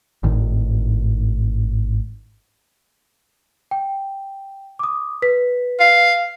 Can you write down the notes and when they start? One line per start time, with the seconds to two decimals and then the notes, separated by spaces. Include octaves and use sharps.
0.23 G#1 A2 D#3
3.71 G5
4.79 D6 D#6
5.22 B4 B6
5.80 F5